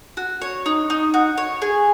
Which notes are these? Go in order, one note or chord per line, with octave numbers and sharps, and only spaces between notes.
F#4
C#5
D#4
D#4
F#4
C#5
G#4